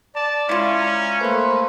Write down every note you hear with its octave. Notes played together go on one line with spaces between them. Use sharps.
D5 A5
G#3 C#4 E4 F4
A#5
A3 A#3 B4 C5 C6